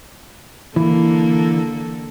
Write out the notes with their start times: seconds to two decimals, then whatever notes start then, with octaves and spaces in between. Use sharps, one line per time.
0.76 D3 E3 A#3 A4